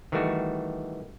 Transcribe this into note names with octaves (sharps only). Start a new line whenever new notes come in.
D#3 E3 G3 A3 F#4